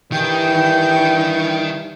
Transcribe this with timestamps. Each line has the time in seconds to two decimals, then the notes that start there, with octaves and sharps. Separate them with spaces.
0.12 G2 D#3 E3 G5